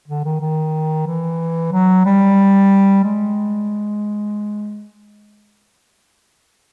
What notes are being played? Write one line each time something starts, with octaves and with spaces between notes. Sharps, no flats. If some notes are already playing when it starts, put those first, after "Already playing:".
D3
D#3
D#3
E3
F#3
G3
G#3